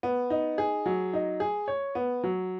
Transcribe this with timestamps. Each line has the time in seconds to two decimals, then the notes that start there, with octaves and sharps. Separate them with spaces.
0.03 B3
0.30 D#4
0.58 G#4
0.86 F#3
1.13 D#4
1.40 G#4
1.68 C#5
1.95 B3
2.24 F#3